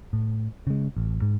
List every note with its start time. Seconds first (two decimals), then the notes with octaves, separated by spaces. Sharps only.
0.13 A2
0.67 C#3 G#3
0.97 A1
1.22 G#2